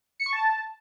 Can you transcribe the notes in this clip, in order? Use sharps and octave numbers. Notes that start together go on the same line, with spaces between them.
C#7
C#6
A5